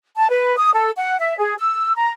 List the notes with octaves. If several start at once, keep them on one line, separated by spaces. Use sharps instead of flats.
A5
B4
D#6
A4
F#5
E5
G#4
E6
A#5